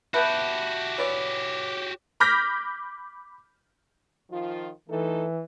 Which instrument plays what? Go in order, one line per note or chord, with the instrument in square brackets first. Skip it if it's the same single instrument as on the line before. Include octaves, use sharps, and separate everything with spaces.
[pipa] B3 B4 [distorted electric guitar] F#4 G4 [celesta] E5 A5 G6
[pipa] E3 D5 [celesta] C#5
[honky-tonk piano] B5 D6 F6 G6 A#6 B6
[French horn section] D#3 F3 F4
[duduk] E3 [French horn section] A3 D#4 A4